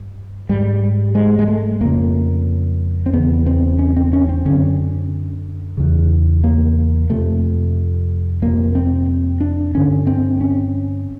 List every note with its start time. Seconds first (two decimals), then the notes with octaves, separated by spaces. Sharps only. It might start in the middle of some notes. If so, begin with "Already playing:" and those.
Already playing: G2
0.49 G#2 G3
1.15 G#3
1.39 G#3
1.48 A3
1.81 F2 C#3 A#3
3.06 C4
3.13 E2 C#3 B3
3.46 C4
3.79 C#4
3.96 C4
4.13 C#4
4.29 C4
4.45 F#2 D3 C#4
5.77 E2 C#3
6.44 A#3
7.10 F2 C3 A3
8.42 F2 C3 A#3
8.75 C4
9.41 D4
9.75 G2 D3 C#4
10.07 C4
10.41 C#4